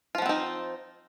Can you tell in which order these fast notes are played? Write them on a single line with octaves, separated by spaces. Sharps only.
F4 F3 B3 C4 D#4